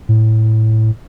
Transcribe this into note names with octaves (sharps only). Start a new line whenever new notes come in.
A2